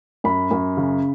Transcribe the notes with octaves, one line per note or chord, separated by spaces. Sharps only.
F#2 B5
F#2
C#3